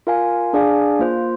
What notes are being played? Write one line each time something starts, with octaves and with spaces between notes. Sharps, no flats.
F4 A#4 F5 G#5
D4 G#4 D5 F5 G#5
A#3 F4 C5